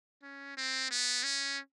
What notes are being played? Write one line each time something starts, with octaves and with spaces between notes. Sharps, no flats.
C#4
C4
B3
C#4